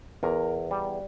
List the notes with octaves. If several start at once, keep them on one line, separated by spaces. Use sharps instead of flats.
E2 A#4
G3